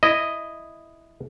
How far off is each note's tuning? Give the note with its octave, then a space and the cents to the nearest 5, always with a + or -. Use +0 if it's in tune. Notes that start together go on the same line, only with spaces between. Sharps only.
E4 +0 D#5 +0